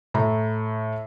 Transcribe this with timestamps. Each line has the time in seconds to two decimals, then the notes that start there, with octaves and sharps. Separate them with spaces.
0.14 A2 A#5